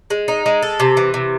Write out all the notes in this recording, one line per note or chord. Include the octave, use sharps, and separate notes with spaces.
G#3
D#4
G#3
A4
C3
E3
C3